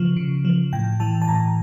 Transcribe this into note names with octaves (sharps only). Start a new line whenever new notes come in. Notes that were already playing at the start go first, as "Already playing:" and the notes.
Already playing: C#3 F3
C#3
F3
A2 G5
E3 A5
A5
A2 A#5